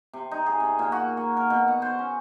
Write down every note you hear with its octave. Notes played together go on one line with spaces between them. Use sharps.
C3
D#4
G#4
C3
A#2
F#4
A#3
A#4
B2
F#5
C5
C#4